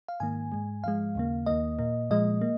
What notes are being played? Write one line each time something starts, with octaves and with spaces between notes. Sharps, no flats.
F5
G#2 D#3 A#3 G#5
G#2 G#3
G#2 F3 G#3 F5
D#2 C#3 A#3
D#2 D#3 A#3 D#5
A#2 A#3
A#2 F3 G#3 D#5
A#3